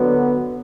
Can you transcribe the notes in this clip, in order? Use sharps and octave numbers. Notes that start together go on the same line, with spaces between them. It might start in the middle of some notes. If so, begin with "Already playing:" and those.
Already playing: D3 F#3 B3